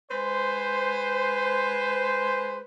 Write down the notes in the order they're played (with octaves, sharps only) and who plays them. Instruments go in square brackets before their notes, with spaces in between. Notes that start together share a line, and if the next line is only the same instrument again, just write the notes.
[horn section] G#3 B4 C5